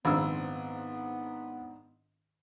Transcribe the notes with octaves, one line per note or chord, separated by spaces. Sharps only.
A#1 G#2 D#3 B3 C4 D4 E6